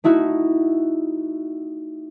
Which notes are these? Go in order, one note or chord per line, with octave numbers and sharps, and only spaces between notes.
A3 D#4 E4 F#4